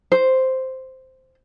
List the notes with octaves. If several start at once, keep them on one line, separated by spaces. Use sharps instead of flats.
C5